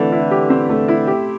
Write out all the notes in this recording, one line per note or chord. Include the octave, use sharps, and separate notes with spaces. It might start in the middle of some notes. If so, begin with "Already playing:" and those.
Already playing: D3 E3 A3 C4
E4
G4
C4
A3
E4
G4